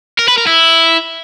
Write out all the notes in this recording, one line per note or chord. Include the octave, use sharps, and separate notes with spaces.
A#4
B4
A#4
E4